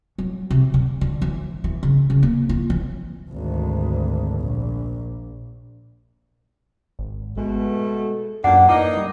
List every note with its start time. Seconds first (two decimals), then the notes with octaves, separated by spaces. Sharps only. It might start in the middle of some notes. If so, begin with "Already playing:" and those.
0.18 F#3
0.50 C3
0.74 D3
1.01 D3
1.22 E3
1.64 E3
1.83 C#3
2.10 C#3
2.23 A#3
2.49 F4
2.70 E3
3.30 G#1 D2
4.41 A#1
6.99 G#1
7.37 B2 G#3 A3 B3
8.44 F#2 A#2 D4 F#5
8.69 E3 A#3 D#4 D#5 D6
8.97 G3